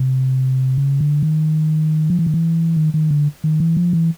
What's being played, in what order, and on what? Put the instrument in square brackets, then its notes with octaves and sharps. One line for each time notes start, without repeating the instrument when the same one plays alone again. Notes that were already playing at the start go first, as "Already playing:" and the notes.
Already playing: [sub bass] C3
C#3
D3
D#3
F3
E3
D#3
E3
D#3
D#3
D3
D#3
E3
F3
E3